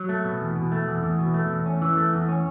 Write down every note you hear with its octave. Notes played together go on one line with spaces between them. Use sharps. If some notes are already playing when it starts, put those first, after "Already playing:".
Already playing: F#3
A3
B2
E2
B2
A3
E2
E2
B2
A3
E2
C#4
E3
A3
E2
C#4